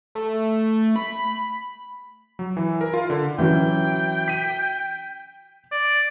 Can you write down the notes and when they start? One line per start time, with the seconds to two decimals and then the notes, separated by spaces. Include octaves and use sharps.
0.15 A3
0.96 B5
2.39 F#3
2.57 E3
2.81 A#4
2.94 F4
3.10 D3
3.39 E3 F#3 C#4 G5
4.28 B6 D#7
5.72 D5